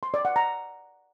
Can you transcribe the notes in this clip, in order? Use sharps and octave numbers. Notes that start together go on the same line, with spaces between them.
C6
D5
F#5
A#5